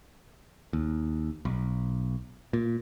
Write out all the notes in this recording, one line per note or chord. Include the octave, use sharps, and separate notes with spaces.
D#2
B1
A#2